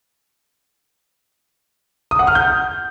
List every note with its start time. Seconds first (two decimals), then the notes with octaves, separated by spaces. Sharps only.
2.11 D#6
2.19 F#5
2.27 F6
2.35 G6